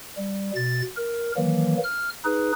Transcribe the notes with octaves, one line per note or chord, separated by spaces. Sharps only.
G3
B2 A6
A#4
D#3 E3 F#3 A#3
F6
D#4 G#4 B4